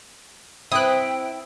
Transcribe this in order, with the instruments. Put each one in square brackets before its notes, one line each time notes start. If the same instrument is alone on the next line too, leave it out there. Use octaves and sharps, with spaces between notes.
[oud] C4 B4 [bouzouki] E4 [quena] G5 [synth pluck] D#6 F#6